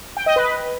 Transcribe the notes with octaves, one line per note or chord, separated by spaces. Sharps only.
G5
D#5
B4